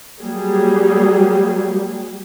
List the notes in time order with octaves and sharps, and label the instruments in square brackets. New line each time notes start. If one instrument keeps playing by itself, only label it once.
[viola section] F#3 G3 A#3 G#4